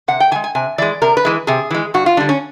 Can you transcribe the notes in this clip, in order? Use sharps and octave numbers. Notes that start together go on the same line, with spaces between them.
C3 F#5
G5
E3 G#5
G#3
G#5
C3 G#5
E3 G#3 D5
C3 A#4
B4
E3 G#3
C3 G#4
E3 G#3
G2 F#4
F4
D3 G3 D4
C#4